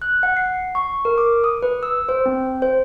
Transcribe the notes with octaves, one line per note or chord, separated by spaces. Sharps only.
F#6
F#5
C7
C#6
A#4
D6
D#6
B4
E6
C5
C4
C5